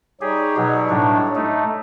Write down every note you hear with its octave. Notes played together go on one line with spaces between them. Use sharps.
G3 D#4 G4 G#4 C#5
B2 F#3
A2 D4
A3 D#4